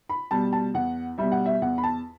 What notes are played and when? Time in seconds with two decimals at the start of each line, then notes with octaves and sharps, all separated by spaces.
0.09 B5
0.31 B2 G3 A5
0.53 A5
0.74 E2 F#5
1.18 B2 G3 E5
1.32 F#5
1.46 E5
1.62 E2 F#5
1.78 B5
1.84 A5